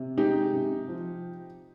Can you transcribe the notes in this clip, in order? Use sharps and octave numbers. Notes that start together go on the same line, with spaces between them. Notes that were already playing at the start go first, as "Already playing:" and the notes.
Already playing: C3
G#3 D#4 G4
C3
F3